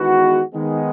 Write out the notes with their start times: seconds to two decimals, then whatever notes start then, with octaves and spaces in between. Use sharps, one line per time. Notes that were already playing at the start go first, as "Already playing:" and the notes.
Already playing: E2 D#3 G#3 B3 F#4
0.54 D#3 G#3 B3